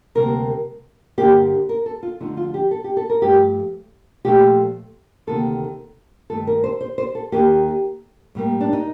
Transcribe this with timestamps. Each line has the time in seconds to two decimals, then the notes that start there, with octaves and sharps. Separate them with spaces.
0.15 D2 C3 G3 A#3 A#4
1.18 G2 D3 G3 A#3 G4
1.69 A#4
1.86 A4
2.03 F4
2.20 F2 D3 F3 A3 D#4
2.37 F4
2.54 G4
2.71 A4
2.84 G4
2.97 A4
3.09 A#4
3.22 G2 F3 A3 G4
4.25 A#2 F3 A3 G4
5.27 D2 C3 D#3 A#3 A4
6.30 G2 D#3 A3 A4
6.47 A#4
6.64 C5
6.81 C5
6.98 C5
7.15 A4
7.32 D#2 D#3 A#3 G4
8.35 A2 G3 A#3
8.61 D4
8.73 D#4